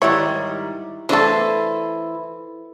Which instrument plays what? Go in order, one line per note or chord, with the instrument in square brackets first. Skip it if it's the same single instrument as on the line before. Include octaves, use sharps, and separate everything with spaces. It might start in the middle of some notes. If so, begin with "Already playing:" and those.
[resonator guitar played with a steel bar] G#2 D#3 G3 [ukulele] E4 [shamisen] C#5
[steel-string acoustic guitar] E3 [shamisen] A3 D4 [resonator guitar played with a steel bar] A4 C5